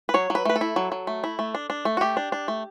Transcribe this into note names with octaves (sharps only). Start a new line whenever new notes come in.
B4
F#3 C#5
F#3 B4
A3 B4
A4
E4
F#3
F#3
A3
E4
A3
D4
D4
A3
F#4
A3 G4
D4
D4
A3